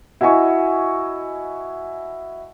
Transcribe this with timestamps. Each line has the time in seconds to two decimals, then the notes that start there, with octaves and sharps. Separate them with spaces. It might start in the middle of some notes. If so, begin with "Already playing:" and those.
0.21 E4 F#4 D#5 G#5 C#6